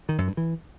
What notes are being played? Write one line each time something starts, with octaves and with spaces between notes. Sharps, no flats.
D#3
F#2
G2
E3